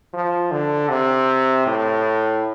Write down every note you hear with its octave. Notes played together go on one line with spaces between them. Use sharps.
F3
D3
C3
A2